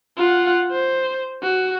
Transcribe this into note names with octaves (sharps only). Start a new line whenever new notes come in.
F4 F#5
C5
F#4